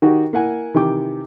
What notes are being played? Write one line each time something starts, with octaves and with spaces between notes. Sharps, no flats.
D#3 D#4 F#4 G4
A#3 E4 F#5 G#5
C3 D#3 E3 G5 D6